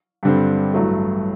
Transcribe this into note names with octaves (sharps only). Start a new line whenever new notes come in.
G2 D3 G3 C4
A1 G2 F#3 A3